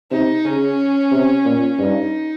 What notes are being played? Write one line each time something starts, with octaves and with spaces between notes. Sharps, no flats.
C3 D#4
C#3 C#4
C3
A#2
G2 D#4